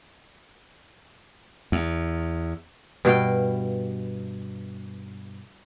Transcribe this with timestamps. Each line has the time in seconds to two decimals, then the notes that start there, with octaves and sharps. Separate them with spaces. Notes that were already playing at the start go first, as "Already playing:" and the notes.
1.72 E2
3.05 G2 B2 F5 G5